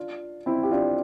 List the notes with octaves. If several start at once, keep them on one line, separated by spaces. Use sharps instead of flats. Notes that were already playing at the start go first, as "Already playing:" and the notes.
Already playing: D4 F4
C4 E4
G4
D4 F4